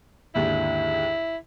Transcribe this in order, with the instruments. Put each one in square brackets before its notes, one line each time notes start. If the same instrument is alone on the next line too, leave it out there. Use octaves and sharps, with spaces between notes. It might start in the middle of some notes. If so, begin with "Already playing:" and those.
[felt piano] D#2 G#2 D3 [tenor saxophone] E4